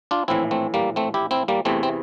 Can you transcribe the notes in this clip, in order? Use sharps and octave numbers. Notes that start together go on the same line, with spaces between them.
D4 F4
A#1 A2 E3 C4 E4
A3 C4
G3 A#3
A3 C4
E4 G4
C4 E4
G3 A#3
E2 C3 E3 A3 C4
C4